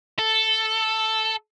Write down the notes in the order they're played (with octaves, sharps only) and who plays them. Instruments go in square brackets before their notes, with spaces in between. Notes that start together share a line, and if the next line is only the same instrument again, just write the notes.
[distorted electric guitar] A4